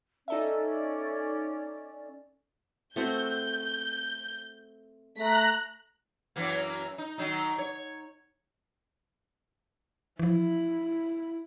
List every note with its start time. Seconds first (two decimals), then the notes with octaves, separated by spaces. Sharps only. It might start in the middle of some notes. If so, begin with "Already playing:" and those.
0.28 C#4 D#4 A4 D5 E5
2.96 A3 C4 F#4 G6
5.17 A3 A#5 F#6 B6
6.36 F#2 E3 A#3
6.98 D#4
7.18 D#3 F#3 D#4
7.58 C#5
10.19 E3 F3 E4